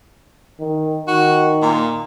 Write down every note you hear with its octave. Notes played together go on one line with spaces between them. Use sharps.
D#3
D#3 F#4
A#2